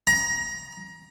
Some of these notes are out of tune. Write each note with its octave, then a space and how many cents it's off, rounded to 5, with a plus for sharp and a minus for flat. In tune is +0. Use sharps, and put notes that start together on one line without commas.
A#5 +25